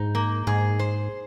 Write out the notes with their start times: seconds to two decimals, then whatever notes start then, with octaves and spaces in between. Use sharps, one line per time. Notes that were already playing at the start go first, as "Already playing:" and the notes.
Already playing: G#2 D#4
0.15 A#3
0.47 G#2 G#4
0.79 C5